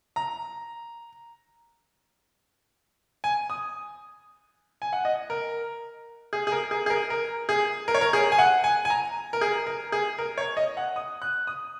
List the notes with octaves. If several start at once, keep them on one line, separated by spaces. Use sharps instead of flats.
A#5
G#5
D#6
G#5
F#5
D#5
A#4
G#4
G#4
A#4
G#4
G#4
A#4
A#4
G#4
A#4
C#5
A#4
G#4
G#5
F#5
G#5
G#5
A#5
A#4
G#4
A#4
G#4
A#4
C#5
D#5
F#5
D#6
F#6
D#6